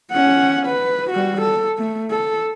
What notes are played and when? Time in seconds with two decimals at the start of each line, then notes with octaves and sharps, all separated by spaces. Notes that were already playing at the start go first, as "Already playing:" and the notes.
0.13 C#4 F#5
0.67 B4
1.10 G3 F#4
1.42 A4
1.77 A3
2.11 A4